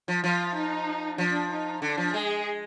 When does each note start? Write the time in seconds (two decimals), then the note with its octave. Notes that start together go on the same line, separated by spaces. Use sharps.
0.08 F3
0.23 F3 F4
0.56 D#4
1.18 F3 D4
1.51 D#4
1.82 D3 D4
1.98 F3
2.14 G#3 G#4